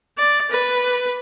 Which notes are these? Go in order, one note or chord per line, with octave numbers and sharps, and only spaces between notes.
D5
B4